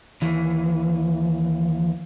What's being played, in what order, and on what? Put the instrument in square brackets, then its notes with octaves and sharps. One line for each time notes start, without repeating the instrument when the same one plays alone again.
[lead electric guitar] D#2 E3